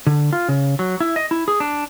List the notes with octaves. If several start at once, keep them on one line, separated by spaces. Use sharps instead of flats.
D3
F4
C#3
F#3
E4
D#5
E4
G#4
D4